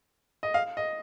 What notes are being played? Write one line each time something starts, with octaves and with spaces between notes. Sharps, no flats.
D#5
F5
D#5